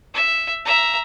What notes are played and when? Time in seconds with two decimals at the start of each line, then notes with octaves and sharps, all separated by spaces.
0.14 E5
0.66 E5 A#5